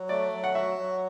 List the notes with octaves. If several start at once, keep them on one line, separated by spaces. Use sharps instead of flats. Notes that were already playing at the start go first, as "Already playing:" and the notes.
Already playing: F#3
A3 D5
F#3
F#5
F#4 E5
F#3